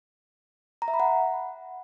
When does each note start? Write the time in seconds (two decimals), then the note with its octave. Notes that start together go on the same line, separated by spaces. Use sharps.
0.82 A#5
0.88 E5
0.94 B5
1.00 F#5